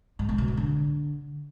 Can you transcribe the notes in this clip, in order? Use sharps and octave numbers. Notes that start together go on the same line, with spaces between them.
G#2
C3
B2
A2
D3